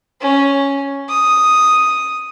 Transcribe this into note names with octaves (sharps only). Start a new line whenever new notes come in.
C#4
D#6